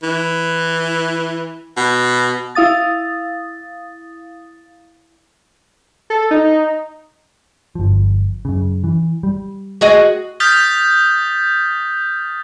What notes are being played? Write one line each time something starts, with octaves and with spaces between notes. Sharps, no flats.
E3
B2
E4 F5 D#6 A6
A4
D#4
G1 F3
F#2 C#3
E3
G3
F#4 G#4 D#5
D#6 F6 G6 A6 B6 G7